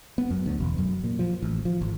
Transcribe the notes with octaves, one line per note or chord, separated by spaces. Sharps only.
B3
F#2
D2
E1
F#2
A#2
F3
A1
F3
G#1